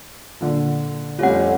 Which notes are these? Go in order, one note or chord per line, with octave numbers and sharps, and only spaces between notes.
A#2 D3
F2 G3 A3 C4 C#4 F4 F#5